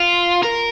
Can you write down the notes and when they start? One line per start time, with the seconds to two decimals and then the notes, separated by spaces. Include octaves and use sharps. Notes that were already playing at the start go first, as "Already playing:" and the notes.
Already playing: F4
0.43 A#4